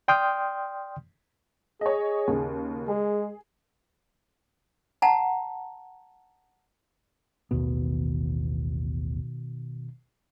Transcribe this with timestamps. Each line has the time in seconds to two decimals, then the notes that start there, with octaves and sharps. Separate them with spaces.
0.08 D5 G5 C6 D#6 F6 G6
1.81 G#4 C#5 D#5
2.27 D#2 C#3
2.88 G#3 G#4
5.02 F#5 A5 A#5
7.51 A1 D#2 B2 D#3 B3